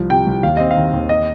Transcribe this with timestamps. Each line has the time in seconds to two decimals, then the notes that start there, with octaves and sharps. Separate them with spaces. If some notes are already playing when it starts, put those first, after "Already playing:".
Already playing: C2 F3
0.10 C3 G5
0.27 C2
0.43 D#2 F5
0.57 C4 D#5
0.71 F5
0.77 D#3
0.93 D#2
1.09 D#5